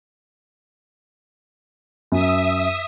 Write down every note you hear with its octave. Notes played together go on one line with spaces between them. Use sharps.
F#2 E5 D#6